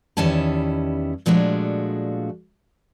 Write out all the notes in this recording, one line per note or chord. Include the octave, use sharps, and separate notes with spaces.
E2 D#3 G3 C#4 E4 A5
A#2 F3 G#3 A3 D4 F#4